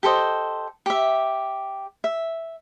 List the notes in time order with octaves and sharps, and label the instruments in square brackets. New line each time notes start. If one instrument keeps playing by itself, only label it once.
[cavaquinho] G4 A4 C5 D#5
G4 E5
E5